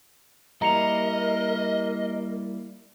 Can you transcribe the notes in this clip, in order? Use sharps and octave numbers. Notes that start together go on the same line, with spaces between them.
G3 A#3 E4 A#4 D#5 A#5 C#7 F7